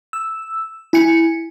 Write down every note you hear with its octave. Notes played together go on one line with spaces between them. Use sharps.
E6
E4 G#5 C#7